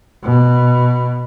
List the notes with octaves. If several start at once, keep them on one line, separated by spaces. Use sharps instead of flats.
B2